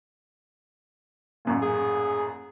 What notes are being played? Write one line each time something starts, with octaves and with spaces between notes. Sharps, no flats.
A1 F#2 A#2
G#4